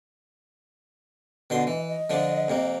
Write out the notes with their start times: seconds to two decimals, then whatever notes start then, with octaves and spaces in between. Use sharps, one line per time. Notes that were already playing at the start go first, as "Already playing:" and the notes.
1.50 B2 D3 C6
1.67 E3 D#5
1.88 D#5
2.10 D3 F3 D4
2.48 F2 C3 A#3